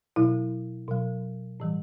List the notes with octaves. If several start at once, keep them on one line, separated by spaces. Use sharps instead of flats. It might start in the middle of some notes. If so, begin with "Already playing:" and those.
B2 F#3 E4
B2 F#3
A2 E3 G3